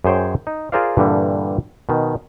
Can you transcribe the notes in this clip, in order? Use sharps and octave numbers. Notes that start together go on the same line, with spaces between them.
F#2 G#4 C5 C#5 G5
D#4
F4 G#4 A#4 C5 D5 F5
G2 A#2 D3 E3 G3
B2 D#3